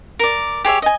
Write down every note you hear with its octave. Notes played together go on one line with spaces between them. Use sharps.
A#4 D5
G4 G#4 C#5 E5
D#5 G#5